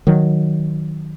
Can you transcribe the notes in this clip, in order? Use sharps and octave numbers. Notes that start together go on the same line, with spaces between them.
D#3 F#3